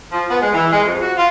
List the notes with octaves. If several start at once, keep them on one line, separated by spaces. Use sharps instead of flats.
F3
B3
G#3
E3
G#3
F2
F#4
F4